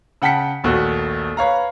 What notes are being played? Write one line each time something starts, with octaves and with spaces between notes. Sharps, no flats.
C#3 F#5 G5 A5 B6 C#7
A#1 D#2 A3 F#4
B4 C#5 F5 A#5